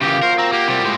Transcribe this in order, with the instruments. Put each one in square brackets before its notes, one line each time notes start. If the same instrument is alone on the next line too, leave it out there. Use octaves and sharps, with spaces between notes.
[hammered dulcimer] F#2 A#2 F#4 [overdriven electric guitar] C#3 E3 [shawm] G4
[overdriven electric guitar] A#4 [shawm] C5
[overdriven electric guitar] C4 [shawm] A#5
[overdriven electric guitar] A#3 [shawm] G4
[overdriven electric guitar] C3 G3 [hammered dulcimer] E4 C5 C6
[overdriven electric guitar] A2 G#3